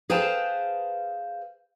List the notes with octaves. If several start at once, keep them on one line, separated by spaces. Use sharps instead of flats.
G#4 B4 C5 F5 G5 A5